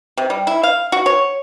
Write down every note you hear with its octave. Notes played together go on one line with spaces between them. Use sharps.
C3
G3
E4
F5
F#4
C#5